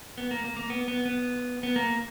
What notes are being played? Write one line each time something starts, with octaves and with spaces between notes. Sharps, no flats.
B3
A#3
A#3
A#3
B3
B3
B3
B3
A#3